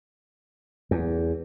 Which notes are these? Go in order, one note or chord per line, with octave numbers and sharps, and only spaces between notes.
E2